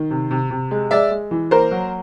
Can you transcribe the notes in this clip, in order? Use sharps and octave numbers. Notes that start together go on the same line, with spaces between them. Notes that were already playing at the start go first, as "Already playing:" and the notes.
Already playing: D#3
C3
C3
C3
G#3
G#3 D5 E5
G#3
E3
A#3 A#4 C5
F#3